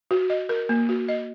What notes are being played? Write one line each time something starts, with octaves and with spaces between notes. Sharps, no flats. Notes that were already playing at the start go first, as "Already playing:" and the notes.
F#4
D#5
A#4
A#3
F#4
D#5